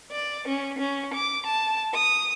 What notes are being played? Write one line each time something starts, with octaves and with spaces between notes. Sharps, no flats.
D5
C#4
C#4
D6
A5
D#6